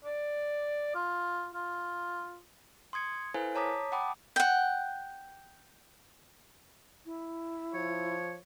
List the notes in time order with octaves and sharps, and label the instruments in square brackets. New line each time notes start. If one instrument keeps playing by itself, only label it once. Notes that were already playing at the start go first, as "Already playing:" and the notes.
[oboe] D5
F4
F4
[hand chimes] C6 D#6 G#6 C#7
E4 A4 B4 C5 F5 G#5
C#5 A5 A#5 D6 D#6 B6
F#5 G5 A5 B5 D6 D#6
[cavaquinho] F#5 G5
[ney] E4
[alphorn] F3 [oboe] C#5